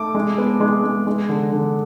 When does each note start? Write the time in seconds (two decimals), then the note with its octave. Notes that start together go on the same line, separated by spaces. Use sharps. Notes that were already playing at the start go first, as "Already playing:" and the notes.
Already playing: A3 D6
0.15 G#3
0.38 B3
0.60 G#3
0.84 G#3
1.07 G#3
1.29 D3
1.52 D3